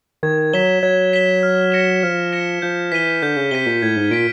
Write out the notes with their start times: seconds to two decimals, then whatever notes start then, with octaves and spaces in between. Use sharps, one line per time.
0.23 D#3 G#6
0.53 F#3 B6 E7 G7
0.83 F#3 G#6
1.13 B6 E7 G7
1.43 F6
1.72 A#6 C#7 E7
2.03 F3 F6
2.33 A#6 C#7 E7
2.62 F3 G6
2.92 E3 B6 D#7 G7
3.22 D3 G6
3.36 C#3
3.51 C3 B6 D#7 G7
3.66 A#2
3.82 A2 G#6
3.96 G#2
4.11 A#2 B6 D7